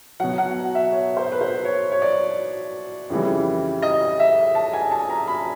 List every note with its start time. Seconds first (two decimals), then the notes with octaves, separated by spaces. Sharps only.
0.20 B2 F#3 F#5
0.38 F#5
0.75 E5
0.92 C#5
1.17 C5
1.32 B4
1.41 C5
1.65 C#5
1.92 C#5
2.02 D5
3.10 F2 C#3 E3 G3
3.82 D#5
4.20 E5
4.55 A5
4.73 G#5
4.91 A5
5.10 A#5
5.28 B5